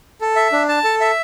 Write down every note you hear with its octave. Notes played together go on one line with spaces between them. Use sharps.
A4
E5
D4
A5
A4
E5